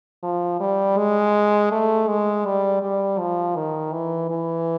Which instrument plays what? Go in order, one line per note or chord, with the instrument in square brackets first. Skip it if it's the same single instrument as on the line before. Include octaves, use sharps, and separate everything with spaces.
[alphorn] F3
G3
G#3
A3
G#3
G3
G3
F3
D#3
E3
E3